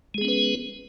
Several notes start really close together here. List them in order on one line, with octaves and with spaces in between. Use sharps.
G#3 G#4 B3 C#4 B4